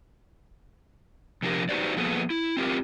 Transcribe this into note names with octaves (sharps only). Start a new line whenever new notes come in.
C3 F3 D4 G4 A#4
D#4 F#4 G4 B4 C5 D5
F3 A#3 B3 G#4 A4 B4
E4
C4 F4 G4 A#4